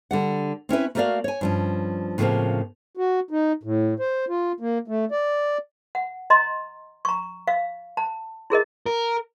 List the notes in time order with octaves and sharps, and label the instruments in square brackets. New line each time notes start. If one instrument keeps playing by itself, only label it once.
[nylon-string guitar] D3 G3 F#5
C4 C#4 E4 B4
A3 A#3 F#4 A#4 D5 F5
C#5 G#5
G2 F3 C#4
A2 C#3 F3 G3 A#3 C4
[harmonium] F#4
D#4
A2
C5
F4
A#3
A3
D5
[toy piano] F#5
D#5 A#5 C6
A#5 C#6
F5
A5
E4 G#4 A#4 D#5
[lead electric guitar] A#4